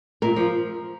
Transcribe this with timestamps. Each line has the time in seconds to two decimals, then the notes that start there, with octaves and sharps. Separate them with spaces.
0.22 A#2 A#4
0.36 F3